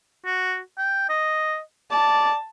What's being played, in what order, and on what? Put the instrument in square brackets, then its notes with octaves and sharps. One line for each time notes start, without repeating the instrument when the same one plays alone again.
[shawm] F#4
G5
D#5
[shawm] D5 [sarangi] A5